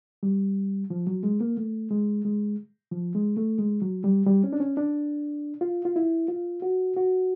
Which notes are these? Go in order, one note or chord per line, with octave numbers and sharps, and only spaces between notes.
G3
F3
F#3
G#3
A#3
A3
G#3
G#3
F3
G#3
A3
G#3
F#3
G3
G3
C#4
D4
C#4
D4
F4
F4
E4
F4
F#4
F#4